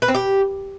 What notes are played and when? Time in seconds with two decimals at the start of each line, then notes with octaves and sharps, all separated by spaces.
0.02 B4
0.08 C4
0.14 G4